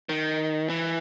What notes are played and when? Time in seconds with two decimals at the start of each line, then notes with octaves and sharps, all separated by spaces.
0.09 D#3
0.69 E3